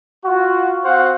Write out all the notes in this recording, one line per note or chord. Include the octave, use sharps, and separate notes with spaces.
F4 F#4
C4 F#4 C5 F5 F#5